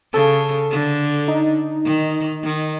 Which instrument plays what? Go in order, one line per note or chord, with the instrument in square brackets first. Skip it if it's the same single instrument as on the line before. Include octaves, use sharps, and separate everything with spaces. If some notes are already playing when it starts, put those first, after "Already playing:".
[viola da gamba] C#3 [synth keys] A4
[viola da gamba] D3
[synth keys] D#4
[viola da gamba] D#3
D#3